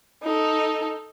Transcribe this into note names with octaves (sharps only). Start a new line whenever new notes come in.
D#4 A4